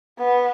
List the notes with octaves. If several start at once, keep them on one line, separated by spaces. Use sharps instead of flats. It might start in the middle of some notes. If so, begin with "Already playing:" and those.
B3